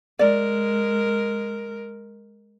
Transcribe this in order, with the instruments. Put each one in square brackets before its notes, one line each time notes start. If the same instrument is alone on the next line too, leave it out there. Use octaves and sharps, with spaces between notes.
[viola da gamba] G#3 A#4 [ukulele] D5